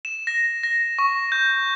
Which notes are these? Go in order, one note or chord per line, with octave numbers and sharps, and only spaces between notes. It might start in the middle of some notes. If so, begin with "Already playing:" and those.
E7
A#6
A#6
C#6
G6